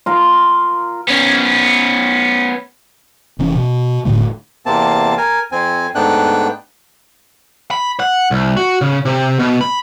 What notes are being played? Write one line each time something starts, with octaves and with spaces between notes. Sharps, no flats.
F4 A#4
B3 C#4
F1 E3 C#4
B2
E1 A2 D3 A3
E2 C3 A#3 C4 A5
A#4 G#5
F2 C4 G#5
G#2 A3 B3 D4 G5 F#6
B5
F#5
C2
F#4
C#3
C3
B2
B5